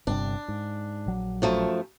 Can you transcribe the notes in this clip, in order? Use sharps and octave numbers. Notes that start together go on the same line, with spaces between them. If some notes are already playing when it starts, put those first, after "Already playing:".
G1 G2 C3 D4
G#2
A#1 F#3
F#2 F3 A3